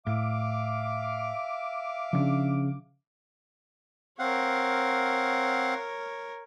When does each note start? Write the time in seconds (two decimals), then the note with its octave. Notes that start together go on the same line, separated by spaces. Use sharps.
0.07 A2 E5 F5 D6
2.13 C#3 F3 D4
4.19 C4 A#4 C#5 F5 F#5